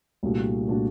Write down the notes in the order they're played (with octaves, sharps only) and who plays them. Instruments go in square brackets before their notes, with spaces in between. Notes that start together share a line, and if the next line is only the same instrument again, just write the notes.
[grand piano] C2 A#2 A3 D4 F#4
A#2 A3 D4 F#4